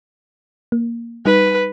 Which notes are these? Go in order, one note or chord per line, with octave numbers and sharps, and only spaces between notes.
A#3
G3 D#4 B4